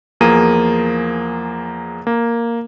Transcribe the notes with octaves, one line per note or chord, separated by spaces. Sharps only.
E2 F3 A#3 G#4 D#7
A#3